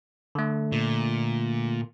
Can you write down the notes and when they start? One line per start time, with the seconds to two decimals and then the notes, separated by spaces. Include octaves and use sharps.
0.35 D3 A3
0.72 A#2